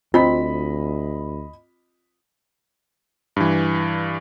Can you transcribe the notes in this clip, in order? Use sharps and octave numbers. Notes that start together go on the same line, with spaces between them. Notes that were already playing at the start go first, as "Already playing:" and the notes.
D2 C4 F4 D#5 B5 B6
G2 E3